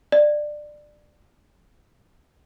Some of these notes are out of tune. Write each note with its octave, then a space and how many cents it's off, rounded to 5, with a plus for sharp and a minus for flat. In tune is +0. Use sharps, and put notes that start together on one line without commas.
D5 +20